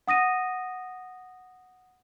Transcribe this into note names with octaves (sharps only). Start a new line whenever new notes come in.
F#5 D#6 A#6 D#7